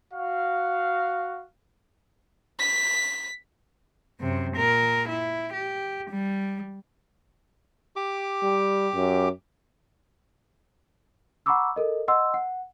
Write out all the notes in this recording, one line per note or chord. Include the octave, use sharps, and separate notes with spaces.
F#4 F5
B6
F#2 C3
A#2 A#4
E4
G4
G3
G4 D6
G3
F#2
F#5 A#5 B5 C#6 D6 E6
A4 A#4 D#5
D#5 F#5 C6 E6
F#5